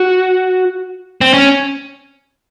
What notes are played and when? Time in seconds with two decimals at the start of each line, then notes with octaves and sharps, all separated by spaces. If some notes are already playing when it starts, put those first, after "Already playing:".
Already playing: F#4
1.21 C4
1.34 C#4